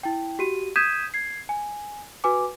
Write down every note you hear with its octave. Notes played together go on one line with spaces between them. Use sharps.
E4 G5
F#4 G4 D#7
D#6 G6 G#6 B6 D#7 E7
G#6 C7
G#5
F#4 B4 G#5 D6